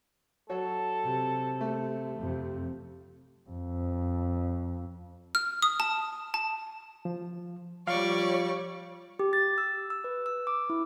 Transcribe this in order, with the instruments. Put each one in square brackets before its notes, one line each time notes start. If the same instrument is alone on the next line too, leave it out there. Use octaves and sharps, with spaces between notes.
[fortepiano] F#3 F#4 C#5 [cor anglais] A4
[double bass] C3
[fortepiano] A3
[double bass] F2 C3
F2
[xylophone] F6
D#6
A5
A5
[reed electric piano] F3
[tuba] F3 [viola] G3 C#6 [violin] C#5 D5 [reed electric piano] F5
[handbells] G4
A6
E6
E6
B4
E6
D6
E4